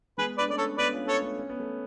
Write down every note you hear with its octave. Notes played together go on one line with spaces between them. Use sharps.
G#3 B3 G#4 B4
D4 B4 D5
A3 C#4 D5
A4 C#5
B3 D4 B4 D5
C#4 F4
A4 C#5
A3 C#4
C#4
B3
A3